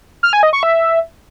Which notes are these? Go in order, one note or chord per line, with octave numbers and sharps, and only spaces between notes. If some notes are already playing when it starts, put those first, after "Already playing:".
F6
G#5
D#5
C#6
E5